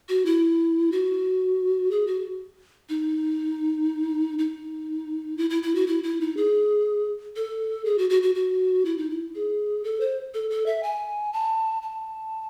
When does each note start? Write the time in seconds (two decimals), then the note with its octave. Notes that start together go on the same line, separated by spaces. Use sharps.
0.09 F#4
0.25 E4
0.92 F#4
1.91 G#4
2.07 F#4
2.89 D#4
4.38 D#4
5.38 E4
5.50 E4
5.63 E4
5.75 F#4
5.87 E4
6.03 E4
6.21 D#4
6.37 G#4
7.36 A4
7.85 G#4
7.98 F#4
8.10 F#4
8.22 F#4
8.35 F#4
8.85 E4
8.98 D#4
9.10 E4
9.35 G#4
9.84 A4
10.00 C5
10.34 A4
10.50 A4
10.66 E5
10.83 G#5
11.33 A5
11.82 A5